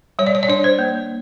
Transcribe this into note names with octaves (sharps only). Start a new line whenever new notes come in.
G3 C#5
D5
C#5
D5
D4 C#5
C5
A#3